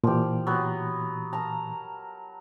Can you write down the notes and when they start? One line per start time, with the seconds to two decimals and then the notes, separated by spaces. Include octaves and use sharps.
0.04 A#2 E3 F3 G4
0.47 F#3 B3
1.33 A#4 A5 A#5